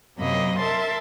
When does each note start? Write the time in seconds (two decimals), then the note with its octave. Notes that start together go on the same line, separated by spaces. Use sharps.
0.17 F#2 C3 F#3 A#3 D#5 B5
0.58 A#4 E5 A5 C6 A6